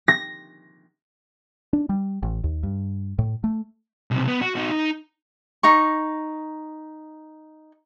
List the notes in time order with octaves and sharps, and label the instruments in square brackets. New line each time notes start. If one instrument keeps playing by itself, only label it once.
[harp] A#6
[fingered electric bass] D4
G3
A1
D#2
G2
A2
A3
[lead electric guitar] B1 C3
B3
F#4
D#4 F#4
D#4
[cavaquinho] D#4 A#5 C#6